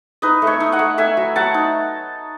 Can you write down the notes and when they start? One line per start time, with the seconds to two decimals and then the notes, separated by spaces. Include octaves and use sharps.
0.22 D#4 B4 D#5
0.42 A3
0.47 C#5 E5
0.60 D#4
0.72 D#5 F#5
0.79 A3
0.98 A3 E5 G#5
1.17 F#3
1.36 F#3 F#5 A5
1.54 D#4